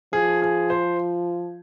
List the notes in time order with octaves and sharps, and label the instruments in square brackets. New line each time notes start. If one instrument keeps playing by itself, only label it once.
[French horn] F3 [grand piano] G#4
[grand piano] G#4
C5